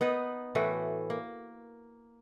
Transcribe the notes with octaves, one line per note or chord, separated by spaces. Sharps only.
B3 D#4 B4
A2 E3 A3 F#4
A#3